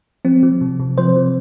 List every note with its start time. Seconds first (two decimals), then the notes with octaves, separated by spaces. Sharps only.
0.25 F3 C4
0.43 F3
0.61 C3
0.80 C3
0.98 F3 C5
1.16 F3